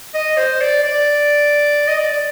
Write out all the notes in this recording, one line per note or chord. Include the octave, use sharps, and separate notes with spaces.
D#5
C5
D5
D5
D#5
D5
D5